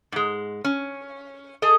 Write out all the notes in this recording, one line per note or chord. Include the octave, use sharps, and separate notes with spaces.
G#2 G#3
C#4
G#4 A4 D#5